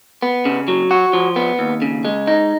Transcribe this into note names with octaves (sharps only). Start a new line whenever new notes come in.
B3
C#3
F#3
F#4
F3
B3
D#2
C#3
G#3
D#4